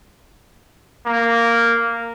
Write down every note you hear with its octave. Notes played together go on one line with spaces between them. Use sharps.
A#3